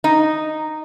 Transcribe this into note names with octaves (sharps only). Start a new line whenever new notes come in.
D#4